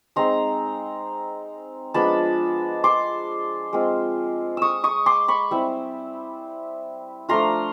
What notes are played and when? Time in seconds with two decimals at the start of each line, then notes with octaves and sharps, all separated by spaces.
0.16 G#3 C4 D#4 A#5 C6
1.94 F3 G#3 B3 D4 A5 B5
2.84 C6 D6
3.73 G#3 C4 F4
4.57 C#6 D#6 E6
4.84 C#6 D#6
5.06 C6 D6
5.28 B5 C#6
5.51 G3 C4 E4
7.29 F3 A3 D4 F4 A#5 C6